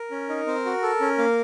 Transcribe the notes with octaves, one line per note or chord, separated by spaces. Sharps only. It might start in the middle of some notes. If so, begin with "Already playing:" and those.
Already playing: A#4
C#4
D#4
C4
F#4
A4
C#4
A#3